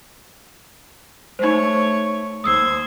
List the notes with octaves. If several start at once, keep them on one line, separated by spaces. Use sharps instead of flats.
A3 D#4 C5 C#5
D#2 C5 D#6 E6 G#6 C7